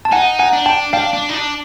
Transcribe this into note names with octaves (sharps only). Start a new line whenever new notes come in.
A5
D#4 F#5 G#5
F#5 G#5
D4
G5 A5
D4 F5 G5
D4
D#4
D4